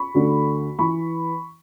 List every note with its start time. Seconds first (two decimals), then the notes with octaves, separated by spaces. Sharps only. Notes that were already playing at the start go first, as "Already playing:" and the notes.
Already playing: B5 C#6
0.14 D2 D3
0.79 E3 B5 C#6